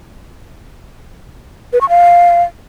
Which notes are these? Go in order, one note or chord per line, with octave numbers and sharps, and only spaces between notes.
B4
C#6
F5